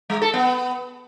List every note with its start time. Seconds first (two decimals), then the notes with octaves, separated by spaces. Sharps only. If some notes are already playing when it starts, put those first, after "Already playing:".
0.10 G#3
0.22 A4
0.34 B3